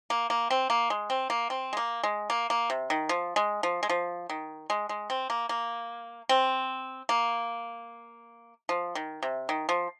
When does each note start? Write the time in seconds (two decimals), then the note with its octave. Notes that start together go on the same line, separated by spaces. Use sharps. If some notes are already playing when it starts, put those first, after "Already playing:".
0.10 A#3
0.30 A#3
0.50 C4
0.70 A#3
0.90 G#3
1.10 C4
1.30 A#3
1.50 C4
1.73 G#3
1.77 A#3
2.03 G#3
2.30 A#3
2.50 A#3
2.70 C3
2.90 D#3
3.09 F3
3.36 G#3
3.63 F3
3.83 G#3
3.89 F3
4.29 D#3
4.70 G#3
4.89 G#3
5.10 C4
5.30 A#3
5.49 A#3
6.29 C4
7.09 A#3
8.69 F3
8.95 D#3
9.22 C3
9.49 D#3
9.69 F3